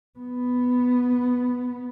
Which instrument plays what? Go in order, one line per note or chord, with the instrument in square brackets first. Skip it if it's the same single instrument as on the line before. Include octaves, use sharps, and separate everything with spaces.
[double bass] B3